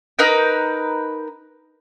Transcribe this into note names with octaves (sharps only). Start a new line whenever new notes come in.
D#4 A#4 B4 G5